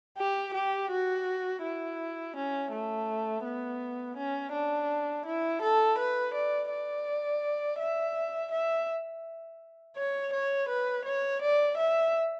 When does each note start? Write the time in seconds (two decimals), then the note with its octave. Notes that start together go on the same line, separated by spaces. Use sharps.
0.18 G4
0.54 G4
0.91 F#4
1.63 E4
2.36 C#4
2.72 A3
3.44 B3
4.17 C#4
4.53 D4
5.25 E4
5.62 A4
5.98 B4
6.34 D5
6.70 D5
7.79 E5
8.51 E5
9.96 C#5
10.33 C#5
10.69 B4
11.05 C#5
11.42 D5
11.77 E5